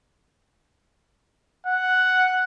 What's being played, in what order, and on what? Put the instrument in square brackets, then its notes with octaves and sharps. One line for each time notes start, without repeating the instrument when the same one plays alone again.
[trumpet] F#5